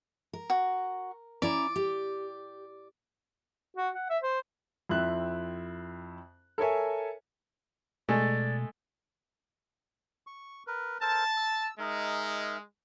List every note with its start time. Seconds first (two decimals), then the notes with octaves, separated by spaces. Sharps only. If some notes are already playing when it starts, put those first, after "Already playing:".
0.33 A#4
0.50 F#4
1.42 C#4 E4 D5 A#5
1.76 G4
3.77 F#4
3.94 F#5
4.10 E5
4.23 C5
4.89 F2 C4 E4 E5 F#6
6.58 A4 A#4 C#5 E5 G#5
8.09 B2 G#3 A3 D5
10.27 C#6
10.67 A#4 B4
11.02 A4 A#4 C5 A5
11.37 E6
11.79 G#3 D#4 A#4 E5